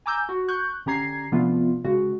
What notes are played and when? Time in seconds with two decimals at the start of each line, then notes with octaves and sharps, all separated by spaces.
0.06 G#5 A#5 D6 E6 G6
0.29 F#4
0.48 C#6 F#6 G6
0.86 D3 C#4 G4 A#5 G#6 C7
1.32 C3 F3 A3 B3 D4 F4
1.84 C#3 G#3 F#4